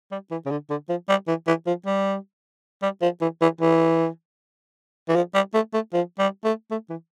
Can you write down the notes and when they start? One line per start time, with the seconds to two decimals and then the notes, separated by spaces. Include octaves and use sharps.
0.12 G3
0.31 E3
0.46 C#3
0.51 D3
0.70 D3
0.89 F3
1.09 G3
1.28 E3
1.47 E3
1.67 F3
1.86 G3
2.82 G3
3.02 F3
3.21 E3
3.42 E3
3.61 E3
5.08 E3
5.15 F3
5.35 G3
5.54 A3
5.74 A3
5.93 F3
6.19 G3
6.44 A3
6.71 A3
6.90 E3